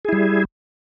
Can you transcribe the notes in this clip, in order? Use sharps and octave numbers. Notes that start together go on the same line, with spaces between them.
G3 E4 G#4